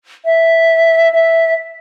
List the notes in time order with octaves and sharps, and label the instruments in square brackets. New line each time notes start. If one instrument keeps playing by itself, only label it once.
[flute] E5
E5